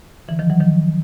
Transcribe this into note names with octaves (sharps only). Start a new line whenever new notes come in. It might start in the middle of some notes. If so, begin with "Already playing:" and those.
D3 E3
D#3 F3
E3 F#3
D#3 F3